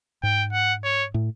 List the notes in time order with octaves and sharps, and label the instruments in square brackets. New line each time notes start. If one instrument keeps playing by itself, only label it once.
[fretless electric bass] G#2 [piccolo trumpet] G5
[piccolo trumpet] F#5
C#5
[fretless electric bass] A2